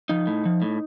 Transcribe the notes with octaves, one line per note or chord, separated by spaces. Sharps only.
F3 D#4
A2
F3
A2